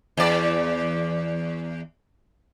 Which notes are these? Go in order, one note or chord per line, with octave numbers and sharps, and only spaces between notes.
E2 D5